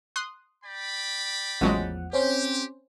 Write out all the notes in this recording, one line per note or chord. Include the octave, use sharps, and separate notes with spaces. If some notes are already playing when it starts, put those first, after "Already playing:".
C6 D#6 F#6
D5 G5 B5
A1 E2 F3 F#3 G#3 F#5
C4 C#4 G4 C5